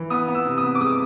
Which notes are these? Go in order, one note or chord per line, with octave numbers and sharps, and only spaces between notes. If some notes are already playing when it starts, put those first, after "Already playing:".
Already playing: E3
B3 D#6
B3
E6
C3
D#6
B3
D6
G#3 D#6